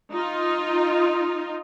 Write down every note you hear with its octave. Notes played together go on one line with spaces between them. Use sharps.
D#4 F4